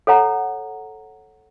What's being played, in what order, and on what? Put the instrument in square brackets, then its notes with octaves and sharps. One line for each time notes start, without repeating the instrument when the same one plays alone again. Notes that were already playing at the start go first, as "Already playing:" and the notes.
[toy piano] A4 C#5 F#5 A#5